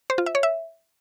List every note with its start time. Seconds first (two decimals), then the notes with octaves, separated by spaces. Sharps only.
0.10 C5
0.18 F4
0.26 E5
0.35 C#5
0.43 E5